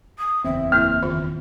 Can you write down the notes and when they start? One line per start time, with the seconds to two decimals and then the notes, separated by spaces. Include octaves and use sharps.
0.18 D#6
0.44 F#1 E2 C4 E5
0.72 A#3 E4 F6
1.03 D#3 F4